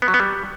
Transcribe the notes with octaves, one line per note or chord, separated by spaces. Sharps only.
B3
F#3
B3
G3